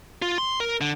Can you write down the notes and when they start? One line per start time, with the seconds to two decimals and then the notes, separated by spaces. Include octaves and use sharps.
0.22 F4
0.38 C6
0.60 A#4
0.81 D3